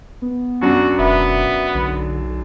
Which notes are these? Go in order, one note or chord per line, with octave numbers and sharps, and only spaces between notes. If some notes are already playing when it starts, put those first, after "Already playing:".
B3
F#2 F#3 D4 F#4
E1 B3 E5
B1 D3